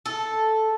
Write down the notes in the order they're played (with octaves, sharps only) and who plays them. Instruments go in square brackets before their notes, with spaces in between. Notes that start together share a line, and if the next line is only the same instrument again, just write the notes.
[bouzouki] A4